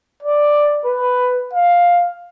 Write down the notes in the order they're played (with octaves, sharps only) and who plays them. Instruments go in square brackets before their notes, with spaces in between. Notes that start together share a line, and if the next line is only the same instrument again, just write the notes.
[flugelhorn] D5
B4
F5